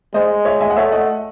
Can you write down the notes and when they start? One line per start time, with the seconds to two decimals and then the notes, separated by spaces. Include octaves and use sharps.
0.14 G#3 C5 D#5
0.45 C#5 E5
0.61 E5 G#5
0.70 F#5
0.76 A3 C#5 E5
0.92 D#5 F#5